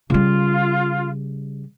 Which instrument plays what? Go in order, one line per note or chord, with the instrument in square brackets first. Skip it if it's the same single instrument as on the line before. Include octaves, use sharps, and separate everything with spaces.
[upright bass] C#3 G3 [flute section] F4